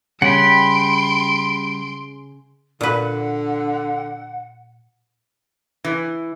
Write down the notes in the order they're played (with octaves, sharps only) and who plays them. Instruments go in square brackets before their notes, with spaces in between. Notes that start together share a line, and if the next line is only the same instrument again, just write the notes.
[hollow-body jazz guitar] C#3 [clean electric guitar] G3 [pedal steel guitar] F#5 G5 B5 [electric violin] C6 D7
[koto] A#2 B4 [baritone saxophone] D3 [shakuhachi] F#5
[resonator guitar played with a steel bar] E3